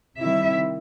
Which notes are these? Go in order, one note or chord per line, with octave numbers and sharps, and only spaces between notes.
C3 D#3 G3 E4 E5